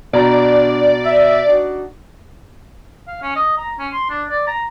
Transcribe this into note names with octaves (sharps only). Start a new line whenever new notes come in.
B2 D4 D5 A#5
E5
D4 D#4 F#4
F5
C#4
D#5
A#5
C#4
C6
D4
D5
A#5